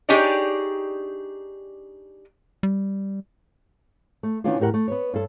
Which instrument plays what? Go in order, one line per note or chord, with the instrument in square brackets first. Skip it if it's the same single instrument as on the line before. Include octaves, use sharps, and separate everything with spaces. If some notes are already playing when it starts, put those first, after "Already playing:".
[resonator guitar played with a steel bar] D4 D#4 G4 G#4 C#5 D5
[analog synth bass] G3
[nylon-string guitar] A3
D#3 E3 B3 C#4 D4 F4
E2 A2 G4 A#4 F#5
A3
B3 B4 C#5
G2 A4